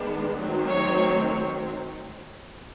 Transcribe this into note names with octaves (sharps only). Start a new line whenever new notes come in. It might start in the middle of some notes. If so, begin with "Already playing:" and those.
Already playing: D#3 G#3 B3 D4
D#3 F#3 A3 C4
C#5